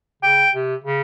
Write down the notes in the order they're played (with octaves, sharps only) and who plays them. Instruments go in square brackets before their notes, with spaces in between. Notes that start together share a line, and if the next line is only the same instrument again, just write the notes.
[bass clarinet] C#3 [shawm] G5
[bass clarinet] C3
C#3